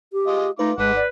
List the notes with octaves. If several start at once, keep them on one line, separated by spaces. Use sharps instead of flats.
G4
G#3 F4 D#5
A3 D#4 F4 B4 D6
G#1 G#3 B4 F#5 D6
D5